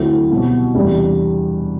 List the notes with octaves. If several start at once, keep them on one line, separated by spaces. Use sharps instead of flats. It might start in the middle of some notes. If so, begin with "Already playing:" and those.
Already playing: D2 D3 F#3 C4 E4
C2 B2 F#3
E2 C3 G3 D4